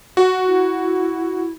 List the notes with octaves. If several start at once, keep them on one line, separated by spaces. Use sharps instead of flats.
F#4
E4